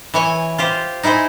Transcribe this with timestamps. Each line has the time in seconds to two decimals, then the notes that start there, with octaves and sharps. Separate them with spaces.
0.14 E3 C#5 G#5
0.58 F4 G4 C5
1.03 D#4 E4 G#4 C5